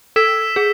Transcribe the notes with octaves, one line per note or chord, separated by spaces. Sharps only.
A4 E6 B6 E7
G#4